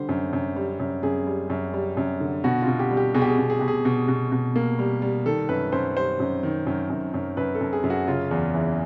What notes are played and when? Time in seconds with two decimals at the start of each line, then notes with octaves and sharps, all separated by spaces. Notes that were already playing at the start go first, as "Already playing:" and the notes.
Already playing: D3 G3 C5
0.09 F#2
0.33 F#2
0.56 G3
0.80 F#2
1.03 F#2 G#4
1.27 G3
1.50 F#2
1.74 G3
1.97 F#2
2.20 D3
2.44 B2 F#4
2.62 F4
2.67 B2
2.79 G4
2.91 G3
2.97 G4
3.14 B2 G#4
3.22 G4
3.29 G#4
3.38 B2
3.50 G#4
3.59 B2 G4
3.68 G#4
3.85 B2
4.08 B2
4.32 B2
4.56 A#3
4.79 G3
5.02 G3
5.26 D#3 A4
5.49 F#2 B4
5.72 F#2 C5
5.96 G3 C5
6.20 F#2
6.43 D#3
6.67 F#2
6.90 F#2
7.14 F#2
7.37 F#2 B4
7.55 A4
7.61 F#2
7.73 G#4
7.84 F#2
7.90 F#4
8.08 C#3 F4
8.31 E2
8.54 E3